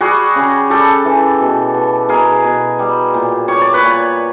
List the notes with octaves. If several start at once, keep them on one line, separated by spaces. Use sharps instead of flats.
G3 F#4 G#4
C#3
G3 G4 A4
E3
B2
B2
B2 G#4 A#4
B2
G3
A#2
G3 C#5
D5
B4 C#5
A#2